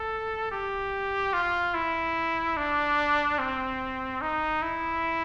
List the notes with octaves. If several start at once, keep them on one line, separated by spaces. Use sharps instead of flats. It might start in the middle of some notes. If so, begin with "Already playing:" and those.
Already playing: A4
G4
F4
E4
D4
C4
D#4
E4